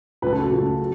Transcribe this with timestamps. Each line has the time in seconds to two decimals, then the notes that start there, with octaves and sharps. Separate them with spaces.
0.22 C#2 C#3 A3 B4
0.32 A4
0.41 F#4
0.51 C#2 C#3 A3
0.79 F#3